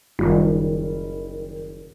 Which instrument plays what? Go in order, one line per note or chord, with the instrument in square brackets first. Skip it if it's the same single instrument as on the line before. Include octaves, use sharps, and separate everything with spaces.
[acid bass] F#1 [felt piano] D#3 G3 F4